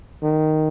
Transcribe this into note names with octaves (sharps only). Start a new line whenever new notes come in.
D#3